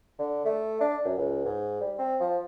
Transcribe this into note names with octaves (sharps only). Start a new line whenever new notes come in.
D3
A3
D4
F#2
C#2
G#2
G3
C4
F3